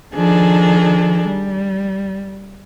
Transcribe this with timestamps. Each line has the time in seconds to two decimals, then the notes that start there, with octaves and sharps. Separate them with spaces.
0.15 D#3 F3 D4 G#4 A4
1.27 G3